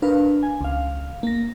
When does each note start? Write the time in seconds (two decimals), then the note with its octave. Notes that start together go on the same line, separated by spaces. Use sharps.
0.02 D4 A#4 B4 F5
0.43 G#5
0.61 C#2 F5
1.23 A#3 A#6